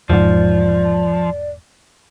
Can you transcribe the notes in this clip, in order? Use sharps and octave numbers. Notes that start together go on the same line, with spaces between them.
E1 G#2 F3 D5